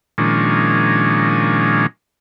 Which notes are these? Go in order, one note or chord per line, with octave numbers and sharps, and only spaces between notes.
A#2 D#3 F3 G#3 C#4 D4